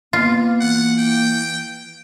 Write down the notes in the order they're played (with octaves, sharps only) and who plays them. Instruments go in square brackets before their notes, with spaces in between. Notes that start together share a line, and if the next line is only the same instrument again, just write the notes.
[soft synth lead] A#3 [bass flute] B3 [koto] F4
[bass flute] E3 [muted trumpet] F#5
[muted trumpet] G5